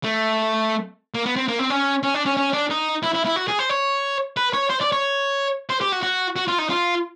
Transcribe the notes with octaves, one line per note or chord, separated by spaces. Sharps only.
A3
A#3
B3
C4
A#3
C4
C#4
C#4
D4
C#4
C#4
D4
D#4
E4
E4
E4
F#4
G#4
C5
C#5
B4
C#5
C5
D5
C#5
C5
G4
F#4
F#4
F#4
F4
D#4
F4